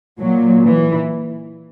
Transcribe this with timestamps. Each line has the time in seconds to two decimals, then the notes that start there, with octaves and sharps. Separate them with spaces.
0.20 A#2 F#3
0.65 E3